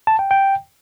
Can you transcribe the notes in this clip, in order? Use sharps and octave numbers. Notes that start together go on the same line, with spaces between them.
A5
G5
G5